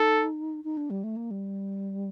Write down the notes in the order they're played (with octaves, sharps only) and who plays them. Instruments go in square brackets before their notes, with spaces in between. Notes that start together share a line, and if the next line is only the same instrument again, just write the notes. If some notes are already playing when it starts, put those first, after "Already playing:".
Already playing: [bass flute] D#4 [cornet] A4
[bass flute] D#4
D4
G3
A3
A#3
G3